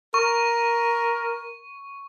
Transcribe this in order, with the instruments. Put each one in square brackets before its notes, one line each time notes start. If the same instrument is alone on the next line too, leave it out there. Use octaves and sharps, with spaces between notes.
[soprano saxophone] A#4 [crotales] C#6